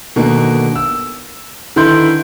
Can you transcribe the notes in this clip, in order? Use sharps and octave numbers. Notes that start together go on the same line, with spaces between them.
B2 D3 D#3 A#3
E6
D3 D#3 E4 B4 C6 G6